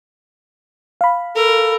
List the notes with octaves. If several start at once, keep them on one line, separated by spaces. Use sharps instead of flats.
F5 B5
A4 A#4